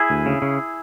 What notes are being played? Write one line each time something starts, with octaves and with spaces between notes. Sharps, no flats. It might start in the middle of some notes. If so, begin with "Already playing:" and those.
Already playing: E4 G#4
D2
C#3
C#3